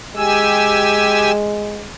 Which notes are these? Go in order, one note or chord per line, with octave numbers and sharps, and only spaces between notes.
G#3 G4 G#5 E6